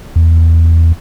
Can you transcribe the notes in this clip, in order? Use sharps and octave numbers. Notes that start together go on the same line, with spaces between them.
E2